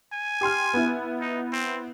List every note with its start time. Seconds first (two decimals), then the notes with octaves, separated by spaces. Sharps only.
0.12 G#5
0.41 G4 C6 F6
0.74 B3 E4
1.21 D#4
1.53 C4